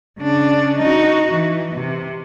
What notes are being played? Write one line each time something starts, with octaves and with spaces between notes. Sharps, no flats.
C#3 D4
D#4 F#4
E3
C3